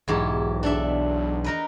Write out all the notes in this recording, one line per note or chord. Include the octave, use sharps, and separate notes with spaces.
B1 E2 G#2 G4
D4 A4 E5
D#4 A#4 B4